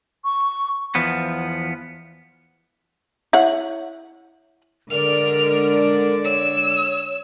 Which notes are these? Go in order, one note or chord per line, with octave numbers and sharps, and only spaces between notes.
C#6
E2 F3 B3
E4 C#5 F#5
D3 G#3 A#4 D5 F6
C#5 E6